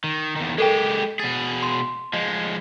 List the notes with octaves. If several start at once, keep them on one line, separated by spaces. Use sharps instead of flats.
D#3
E2 D#3
G#3 G4 A4 A#4 G5
B2 G#4 A6
C6
F3 G#3 D#5